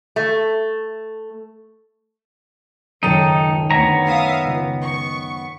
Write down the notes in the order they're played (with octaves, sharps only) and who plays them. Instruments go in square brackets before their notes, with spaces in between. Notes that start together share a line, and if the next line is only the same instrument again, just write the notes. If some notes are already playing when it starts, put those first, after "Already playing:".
[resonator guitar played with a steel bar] A3 A4
[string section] C#2 [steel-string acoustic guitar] F#2 D#3 G5 [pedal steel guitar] D#4 A4
[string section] D2 [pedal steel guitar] B3 C#5 A#5
[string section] E5 F5 D#6
C#2
C#6